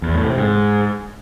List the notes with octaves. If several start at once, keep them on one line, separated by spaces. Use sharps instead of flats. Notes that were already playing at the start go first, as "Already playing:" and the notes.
E2
A2
C3
G#2